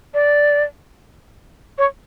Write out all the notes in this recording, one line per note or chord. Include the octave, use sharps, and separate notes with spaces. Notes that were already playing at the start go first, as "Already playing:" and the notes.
D5
C#5